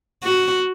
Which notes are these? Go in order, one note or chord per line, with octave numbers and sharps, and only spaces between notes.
F#4